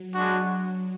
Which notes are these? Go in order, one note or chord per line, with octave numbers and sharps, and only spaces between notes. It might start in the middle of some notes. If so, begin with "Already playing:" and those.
Already playing: F#3
G#3 D4 F#4